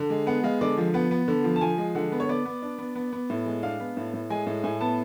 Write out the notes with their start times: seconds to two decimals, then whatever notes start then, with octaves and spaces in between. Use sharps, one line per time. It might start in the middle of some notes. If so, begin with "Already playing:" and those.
Already playing: D3
0.10 G#3
0.27 B3 F#5
0.44 G#3 F5
0.61 D3 D5
0.78 F3
0.94 B3 F#5
1.11 B3
1.28 D3
1.44 F3
1.56 A5
1.61 F3 G#5
1.78 G#3
1.95 D3 F#5
2.12 B3
2.20 C#5
2.29 B3 D5
2.46 B3
2.62 D4
2.78 B3
2.95 B3
3.13 B3
3.30 A2
3.46 G#3
3.63 D4 F5
3.80 B3
3.97 A2
4.13 A2
4.30 G#3 G#5
4.46 A2
4.64 A2 G#5
4.81 B3 A5